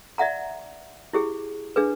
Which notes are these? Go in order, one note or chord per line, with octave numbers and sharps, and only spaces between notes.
D5 E5 F#5 A#5
E4 G4 G#4
D4 G#4 B4